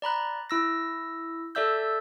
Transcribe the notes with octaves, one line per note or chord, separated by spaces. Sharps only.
D5 A#5 B5 F#6
E4 E6 A#6
A4 D5 E5 E6 G6